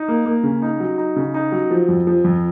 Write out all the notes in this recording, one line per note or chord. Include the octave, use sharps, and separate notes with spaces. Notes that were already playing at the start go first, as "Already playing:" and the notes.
Already playing: D#4
A#3
A#3
C#3
D#4
F#3
D#4
C#3
D#4
F#3
F3
F2
F3
F2